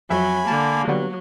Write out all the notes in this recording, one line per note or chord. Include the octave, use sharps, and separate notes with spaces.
F2 F#3 E5 G#5 B5
D3 A#3 A5
D3 F#3 G3 B3